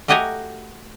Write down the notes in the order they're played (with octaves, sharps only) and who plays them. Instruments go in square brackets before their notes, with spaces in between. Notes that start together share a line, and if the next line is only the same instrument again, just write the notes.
[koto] A3 F#4 G4 D#5 G#5 A#5